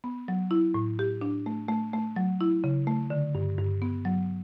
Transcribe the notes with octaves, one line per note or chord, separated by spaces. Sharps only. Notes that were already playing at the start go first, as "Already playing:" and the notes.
B3
F#3
E4
A2
G4
D4
A3
A3
A3
F#3
E4
C#3
A3
D3
G2
G2
B3
F#3